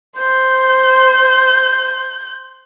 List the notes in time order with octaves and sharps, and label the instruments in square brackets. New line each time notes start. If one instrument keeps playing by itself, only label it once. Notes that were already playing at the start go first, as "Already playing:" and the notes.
[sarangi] C5 [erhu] G6